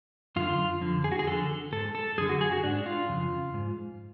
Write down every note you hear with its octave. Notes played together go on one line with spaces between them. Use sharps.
F#2 D3 F4
F2 D3
G#4
F#4
G#4
F2 D3 A4
G#2 A4
A4
F#2 D3 G#4
F#4
G#4
F#4
G#2 D4
F4
F2 C#3
G#2